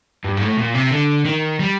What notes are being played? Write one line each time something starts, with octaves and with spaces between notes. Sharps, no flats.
G2
G#2
A2
A#2
C3
D3
D#3
G3